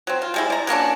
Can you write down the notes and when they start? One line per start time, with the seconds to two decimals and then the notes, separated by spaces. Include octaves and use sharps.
0.07 F#3 C4
0.22 F4
0.34 G3 G#3 E4
0.50 D5 A#5
0.67 F#3 A#3 C#4 D4